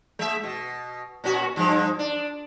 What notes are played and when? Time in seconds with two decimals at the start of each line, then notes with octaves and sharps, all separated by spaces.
0.19 G#3 E5
0.43 B2
1.24 A#2 C#4 F#4
1.56 G2 F3 G#3
1.99 D4